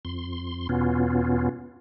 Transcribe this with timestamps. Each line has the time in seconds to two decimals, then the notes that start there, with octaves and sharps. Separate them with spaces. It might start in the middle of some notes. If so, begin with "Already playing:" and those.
0.05 F2 C6
0.69 E2 B2 B3 C#4 F4